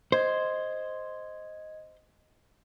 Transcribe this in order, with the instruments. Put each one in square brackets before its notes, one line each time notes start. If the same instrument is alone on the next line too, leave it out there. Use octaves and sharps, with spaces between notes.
[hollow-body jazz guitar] C5 [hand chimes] D#5 G#6